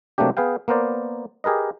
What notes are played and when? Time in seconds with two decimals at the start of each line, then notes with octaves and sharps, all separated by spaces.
0.18 C3 F#3 A3 A#3 D4 G4
0.37 B3 G#4 B4 F5 G5
0.68 A#3 B3 A#4 C5 D5
1.44 G4 G#4 A#4 B4 D#5